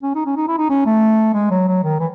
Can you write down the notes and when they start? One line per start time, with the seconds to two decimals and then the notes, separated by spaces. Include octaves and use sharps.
0.03 C#4
0.15 D#4
0.26 C#4
0.37 D#4
0.48 E4
0.58 D#4
0.70 C#4
0.86 A3
1.34 G#3
1.51 F#3
1.68 F#3
1.84 D#3
1.99 E3